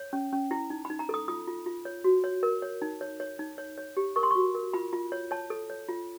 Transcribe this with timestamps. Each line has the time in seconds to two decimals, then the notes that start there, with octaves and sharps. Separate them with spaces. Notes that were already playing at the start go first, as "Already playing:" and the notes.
Already playing: C#5
0.13 C#4
0.33 C#4
0.51 E4
0.70 D#4
0.85 B5
0.90 D#4
0.99 A#5
1.09 A4 D#6
1.28 F4 D#6
1.47 F4
1.66 F4
1.85 C#5
2.04 F#4
2.24 C#5
2.43 A#4
2.62 C#5
2.82 D#4
3.01 C#5
3.20 C#5
3.39 D#4
3.58 C#5
3.78 C#5
3.97 G4
4.16 A#4 C#6
4.23 C6
4.31 F#4 C#6
4.55 A#4
4.73 F4 B5
4.93 F4
5.12 C#5
5.31 C#5 A5
5.50 A4
5.70 C#5
5.89 F4